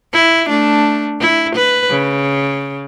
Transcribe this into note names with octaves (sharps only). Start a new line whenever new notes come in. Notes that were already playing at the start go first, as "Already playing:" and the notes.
E4
A3 D4
E4
B4
C#3